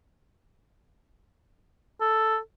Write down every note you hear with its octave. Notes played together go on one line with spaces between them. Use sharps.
A4